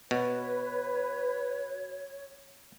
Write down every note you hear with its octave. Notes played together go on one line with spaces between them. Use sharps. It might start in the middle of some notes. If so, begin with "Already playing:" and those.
B2 F#4 B4 C#5